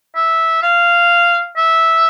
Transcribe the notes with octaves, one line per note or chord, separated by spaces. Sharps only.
E5
F5
E5